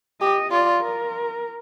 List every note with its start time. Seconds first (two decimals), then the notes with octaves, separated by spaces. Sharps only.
0.21 G4 D#5
0.52 F4 D5
0.83 A#4